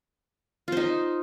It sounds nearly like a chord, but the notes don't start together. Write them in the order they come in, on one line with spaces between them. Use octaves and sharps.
F4 C5 D#4